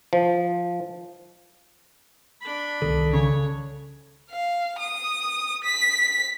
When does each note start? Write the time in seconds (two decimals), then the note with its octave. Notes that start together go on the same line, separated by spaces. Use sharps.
0.13 F3
2.41 D4 B5
2.82 C2 D#3 A4
3.13 C#3 C#5
4.31 F5
4.80 D#6
5.64 B6